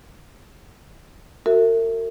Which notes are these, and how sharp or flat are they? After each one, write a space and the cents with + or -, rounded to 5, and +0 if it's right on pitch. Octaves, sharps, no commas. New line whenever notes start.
F#4 +0 A#4 -40 E5 +0